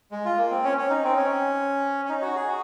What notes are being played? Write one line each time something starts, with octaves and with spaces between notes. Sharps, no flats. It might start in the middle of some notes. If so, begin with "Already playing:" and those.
G#3
F4
A#3
C4
C#4
C#4
D#4
C4
C#4
C#4
D#4
F#4
G#4
F#4